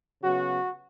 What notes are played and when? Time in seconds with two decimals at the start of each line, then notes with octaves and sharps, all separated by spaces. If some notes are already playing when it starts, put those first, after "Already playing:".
0.23 C#3 F#3 B3 F#4